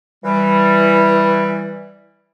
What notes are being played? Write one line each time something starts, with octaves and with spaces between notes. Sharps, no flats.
E3 G3